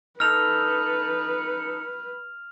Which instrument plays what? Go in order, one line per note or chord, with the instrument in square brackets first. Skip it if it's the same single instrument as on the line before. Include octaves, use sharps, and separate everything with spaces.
[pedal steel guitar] D#4 A4 [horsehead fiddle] B4 [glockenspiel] F6 F7